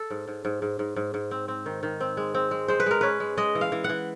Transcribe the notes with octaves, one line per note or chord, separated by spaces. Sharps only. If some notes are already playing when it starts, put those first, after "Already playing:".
Already playing: A4
G#2
G#2
G#2
G#2
G#2
G#2
G#2
C4
C4
D#3
D#3
C4
G#3
C4
G#3
G#3 C5
B4
G#3 A#4
C#4 B4
G#3
G#3 D#5
E3
F5
E3
F#5
E3